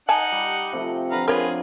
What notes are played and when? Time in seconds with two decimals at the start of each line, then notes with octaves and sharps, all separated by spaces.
0.09 D#4 F#5 G#5 A5
0.32 G3
0.72 C3 F3 A3
1.11 D3 F3 B4 F5 A#5
1.28 D4 F4 G#4 A#4 B4 C#5